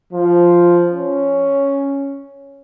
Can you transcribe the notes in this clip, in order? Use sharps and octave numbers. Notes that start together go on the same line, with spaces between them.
F3
C#4